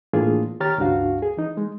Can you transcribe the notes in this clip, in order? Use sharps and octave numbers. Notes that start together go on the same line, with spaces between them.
A2 E3 A#3 D4 F4 G#4
D#3 G4 C#5 A#5 F6 A6
C#2 G2 D4 F#4 F5
G#4
E3 D#4
G#3